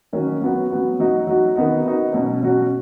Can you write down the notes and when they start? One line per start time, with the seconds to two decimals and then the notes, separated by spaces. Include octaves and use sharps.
0.13 D#3 F#3 C#4 F#4
0.41 F#3 B3 F#4
0.70 F#3 B3 F#4
1.00 F#3 D#4 F#4
1.27 F#3 D#4 F#4
1.56 D#3 B3 D#4 F#4
1.84 D#3 B3 D#4 F#4
2.13 B2 F#3 C#4 F#4
2.43 B2 F#3 C#4 F#4